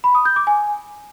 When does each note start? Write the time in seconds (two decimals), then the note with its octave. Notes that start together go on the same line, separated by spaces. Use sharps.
0.04 B5
0.15 D#6
0.25 G6
0.36 D6
0.47 G#5